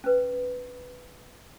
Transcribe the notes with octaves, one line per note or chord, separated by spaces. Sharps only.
C#4 B4